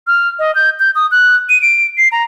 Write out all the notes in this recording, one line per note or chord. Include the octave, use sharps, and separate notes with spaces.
F6
D#5
G6
G6
D#6
F#6
D#7
D7
C7
A#5